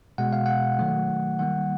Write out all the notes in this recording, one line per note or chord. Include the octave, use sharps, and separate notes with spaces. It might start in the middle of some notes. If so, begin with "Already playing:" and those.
B2 G#3 F#5
F5
F#5
D#3 F#3 A3
D#3 G3 A#3 F#5